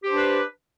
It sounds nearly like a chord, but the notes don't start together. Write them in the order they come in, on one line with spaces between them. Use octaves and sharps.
G4 C5 D4 B4